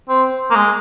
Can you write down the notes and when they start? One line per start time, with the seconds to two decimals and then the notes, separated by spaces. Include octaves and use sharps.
0.09 C4
0.51 A#3
0.55 G#3